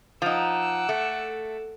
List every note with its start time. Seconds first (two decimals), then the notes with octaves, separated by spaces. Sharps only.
0.22 F3 D#4 F#5 D6 E6
0.89 A3